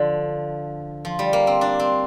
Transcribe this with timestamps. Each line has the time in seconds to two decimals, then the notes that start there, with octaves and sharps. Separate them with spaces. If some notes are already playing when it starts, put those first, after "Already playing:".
Already playing: D3 F3
1.05 F3
1.19 G3
1.33 A#3
1.47 C4
1.61 D4
1.79 C4